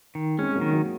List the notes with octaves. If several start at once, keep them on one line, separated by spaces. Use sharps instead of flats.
D#3
G#3 C4 C#4
G#3
F#3 A#3
D#3
F#3 A#3